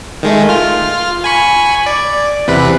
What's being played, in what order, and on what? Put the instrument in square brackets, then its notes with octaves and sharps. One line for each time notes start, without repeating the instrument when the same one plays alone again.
[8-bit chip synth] D#3 G#3 A3
F4 F6
G#5 B5 C#6
D5
E2 C3 B4